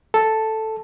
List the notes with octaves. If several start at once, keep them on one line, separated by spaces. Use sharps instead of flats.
A4